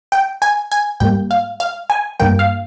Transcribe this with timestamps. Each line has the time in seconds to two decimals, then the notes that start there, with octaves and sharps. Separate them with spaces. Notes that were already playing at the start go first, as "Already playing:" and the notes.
0.12 G5
0.42 G#5
0.71 G#5
1.00 G#2 G3 A#3 G5
1.31 F5
1.60 F5
1.90 G#5
2.20 G2 G3 A#3 G5
2.39 F5